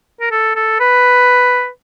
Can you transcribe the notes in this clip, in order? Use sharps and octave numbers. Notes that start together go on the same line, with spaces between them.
A#4
A4
A4
B4